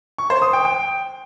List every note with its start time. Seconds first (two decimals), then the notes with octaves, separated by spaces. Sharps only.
0.18 C#6
0.30 C5
0.42 D#6
0.53 G5
0.65 G5